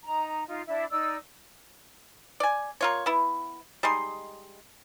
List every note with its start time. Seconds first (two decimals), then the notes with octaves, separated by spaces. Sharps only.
0.04 D#4 A#5
0.47 D#4 F4
0.66 D4 E4
0.90 D#4 D5 E6
2.40 D5 G#5
2.81 A#3 F4 C#5
3.06 B3 E4
3.83 G3 G#3 D#4 C6